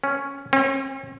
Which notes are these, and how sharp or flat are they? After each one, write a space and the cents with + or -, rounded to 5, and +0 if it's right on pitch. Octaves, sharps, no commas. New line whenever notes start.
C#4 +0
C#4 -45